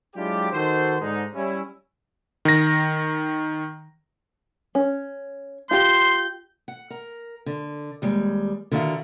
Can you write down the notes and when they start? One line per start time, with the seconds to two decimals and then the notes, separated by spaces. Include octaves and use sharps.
0.16 F#3 G#3 D4 E4 F4 G4
0.52 D#3 D#4 F#4 A4 C5
1.01 G#2 D3 G#3 D#4
1.35 G3 C#4 E4
2.45 D#3 A#6
4.75 C#4
5.71 F4 G4 C6 G6
6.68 F#5
6.90 A#4
7.46 D3
8.02 D#2 G3 G#3
8.71 D3 D#3 E4 F#4 F5